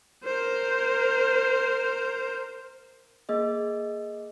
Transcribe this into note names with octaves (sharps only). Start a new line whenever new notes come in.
A#4 C5
A#3 G#4 D#5